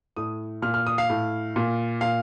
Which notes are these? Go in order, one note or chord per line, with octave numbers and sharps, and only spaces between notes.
A2 D#6
A#2 F6
F6
D#6
F5
A2
A#2
A#2 F5